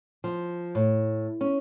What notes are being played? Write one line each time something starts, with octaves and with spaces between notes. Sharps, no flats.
F3
A2
C#4